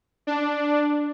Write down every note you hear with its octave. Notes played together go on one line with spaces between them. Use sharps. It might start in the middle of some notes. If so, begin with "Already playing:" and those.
D4